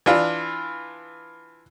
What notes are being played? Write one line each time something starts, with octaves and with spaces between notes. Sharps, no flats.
E3 D4 F4